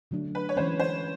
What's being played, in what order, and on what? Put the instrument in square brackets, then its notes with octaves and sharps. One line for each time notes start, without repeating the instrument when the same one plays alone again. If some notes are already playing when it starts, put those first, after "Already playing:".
[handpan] D3 F#3 A3 D4
[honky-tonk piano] B4
C#5
[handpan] E3 G#3 C#4 [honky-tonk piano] C5
[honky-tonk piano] C5